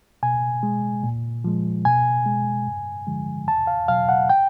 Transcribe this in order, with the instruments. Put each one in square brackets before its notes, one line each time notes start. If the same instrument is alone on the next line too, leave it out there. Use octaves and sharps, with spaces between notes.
[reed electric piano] B2 G#5
G#3
A#2
F3 G#3
B2 G#5
G#3
G2
D3 F3 G#3
E2 A5
F5
B2 F#3 F5
F#5
G5